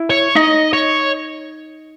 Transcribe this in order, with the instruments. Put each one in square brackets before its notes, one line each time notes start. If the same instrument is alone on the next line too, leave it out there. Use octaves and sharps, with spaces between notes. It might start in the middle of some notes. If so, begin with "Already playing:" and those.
Already playing: [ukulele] E4
[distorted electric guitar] C#5
[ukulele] D#4 [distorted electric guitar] D#5
[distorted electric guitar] C#5